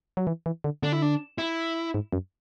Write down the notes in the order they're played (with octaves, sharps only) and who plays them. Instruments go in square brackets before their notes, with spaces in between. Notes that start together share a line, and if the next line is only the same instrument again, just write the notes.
[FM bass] F#3
E3
E3
D3
[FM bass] D3 [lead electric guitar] D4
[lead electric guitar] E4
D4
E4
[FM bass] G#2
F#2